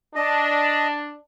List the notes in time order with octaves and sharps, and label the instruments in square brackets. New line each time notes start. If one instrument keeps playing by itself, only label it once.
[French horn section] D4 [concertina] D#5